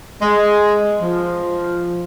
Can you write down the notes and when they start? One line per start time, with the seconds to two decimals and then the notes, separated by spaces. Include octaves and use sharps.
0.22 G#3
1.00 F3